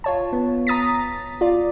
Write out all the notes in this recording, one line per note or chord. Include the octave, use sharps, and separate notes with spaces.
F4 C#5 A5
B3
A#5 D#6 A6 B6
F4 D5